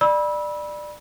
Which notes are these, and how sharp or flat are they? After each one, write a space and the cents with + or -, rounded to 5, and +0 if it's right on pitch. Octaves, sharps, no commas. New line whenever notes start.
D5 +20 B5 -25 E6 -15